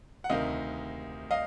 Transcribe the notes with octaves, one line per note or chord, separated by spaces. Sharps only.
F#5
D2 C3 D#3 D#5 F5
D#5 F5